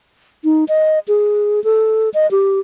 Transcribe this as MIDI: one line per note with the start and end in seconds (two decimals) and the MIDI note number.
0.44 0.64 63
0.68 0.99 75
1.08 1.63 68
1.64 2.09 69
2.14 2.29 75
2.31 2.60 67